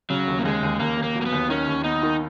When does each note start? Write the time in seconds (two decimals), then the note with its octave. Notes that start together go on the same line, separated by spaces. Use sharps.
0.10 C#3 F#3
0.27 D#2
0.39 A#3
0.45 D#2 G#3
0.63 D#2
0.79 D#2 A#3
0.97 D#2
1.03 A#3
1.15 F#3
1.22 A#3
1.26 B3
1.32 D#2
1.50 D#3 C#4
1.67 D#2
1.84 B3 D#4
2.03 D#3